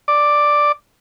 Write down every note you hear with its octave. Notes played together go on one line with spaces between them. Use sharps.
D5